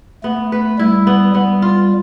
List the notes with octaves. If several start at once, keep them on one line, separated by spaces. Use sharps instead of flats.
A3 B3
B4
G3 E4
B3
G3 B3
F4